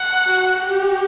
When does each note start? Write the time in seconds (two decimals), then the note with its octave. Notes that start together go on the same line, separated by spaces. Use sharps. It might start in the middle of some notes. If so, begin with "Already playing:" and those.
Already playing: F#5
0.26 F#4
0.59 G4